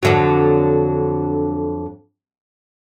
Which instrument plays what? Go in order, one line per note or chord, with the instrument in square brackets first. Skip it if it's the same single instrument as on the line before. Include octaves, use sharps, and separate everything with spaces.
[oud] F2 D3 F#3